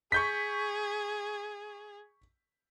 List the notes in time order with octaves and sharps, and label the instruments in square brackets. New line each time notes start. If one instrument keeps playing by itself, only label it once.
[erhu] G#4 [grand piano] C#6 G6 B6